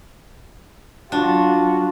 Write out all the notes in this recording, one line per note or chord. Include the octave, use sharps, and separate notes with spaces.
F#3 D4 F4 F#4